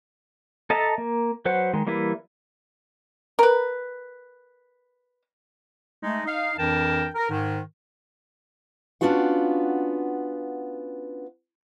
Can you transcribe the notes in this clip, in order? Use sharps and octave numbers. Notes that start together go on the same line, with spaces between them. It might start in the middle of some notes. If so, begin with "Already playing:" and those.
A4 D#5 E5 A5 A#5
A#3
F#3 B4 C5 F#5
D#3 G#3
E3 G3 A#3 E4 B4
A#4 B4
G#3 A3 D#4
D#4 F5
F2 E3 D4 A#4 G5 A5
A#4
G#2 D#3
B3 C#4 D4 F4 F#4 F#5